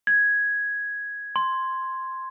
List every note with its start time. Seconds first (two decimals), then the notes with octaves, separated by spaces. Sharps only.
0.07 G#6
1.36 C6